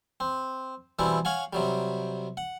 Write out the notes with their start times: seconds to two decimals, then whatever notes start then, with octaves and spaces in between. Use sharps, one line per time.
0.20 C4
0.99 B2 E3 G3 C4 E4
1.25 C#5 F5 F#5 G#5
1.53 C3 F#3 G3
2.37 F#5